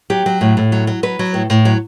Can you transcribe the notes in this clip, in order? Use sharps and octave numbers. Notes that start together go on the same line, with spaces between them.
F#3 G4
F#3
A2
A2
F#3
F#3
F#3 B4
F#3
A2
A2
F#3